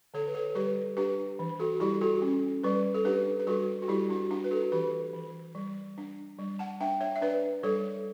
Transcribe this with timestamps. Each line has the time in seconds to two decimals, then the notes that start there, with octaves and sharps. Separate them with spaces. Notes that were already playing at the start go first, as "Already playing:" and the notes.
0.14 D3 A4 C#5
0.27 B4
0.34 A4 C#5
0.55 G3 G4 B4
0.97 D4 G4 B4
1.39 E3
1.60 F#4 A4
1.80 G3 E4 G4
2.01 F#4 A4
2.22 C#4
2.63 G3 B4 D5
2.94 A4
3.05 D4 G4 B4
3.39 B4
3.47 G3 F#4 A4
3.82 F#4
3.88 G3 E4 G4
4.10 D4 F#4
4.31 D4 F#4
4.44 B4
4.51 F#4 A4
4.72 E3 G4 B4
5.13 E3
5.55 G3
5.98 D4
6.38 G3
6.59 F#5 A5
6.81 D4 E5 G5
7.01 C#5 E5
7.16 E5
7.21 D4 B4 D5
7.63 G3 A4 C#5